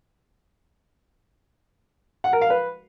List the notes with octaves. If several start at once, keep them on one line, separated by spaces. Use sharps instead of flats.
F#5
A#4
F5
B4